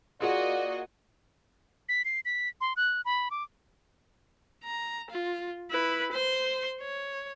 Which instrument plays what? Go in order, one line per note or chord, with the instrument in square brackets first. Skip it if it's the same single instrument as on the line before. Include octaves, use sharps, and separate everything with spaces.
[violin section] A#3 F#4 D#5 [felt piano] F4 G#4 [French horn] D5
[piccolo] B6
C7
B6
C6
F#6
B5
D6
[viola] A#5
F4
E4 B4
C5 C6
C#5